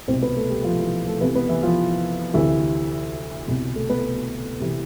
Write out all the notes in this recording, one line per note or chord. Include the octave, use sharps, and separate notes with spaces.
C2 B2 C4 C5
B3 B4
A3 A4
G3 G4
F3 F4
E3 E4
A3 A4
C2 C3 E3 B3 B4
B3 B4
E3 E4
F3 F4
D2 C3 E3 E4
C2 B2
A3 A4
B3 B4
C2 C3 E3